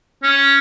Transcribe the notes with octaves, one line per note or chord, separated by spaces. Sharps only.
C#4